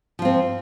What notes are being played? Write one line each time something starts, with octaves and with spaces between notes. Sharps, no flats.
F3 C4 F4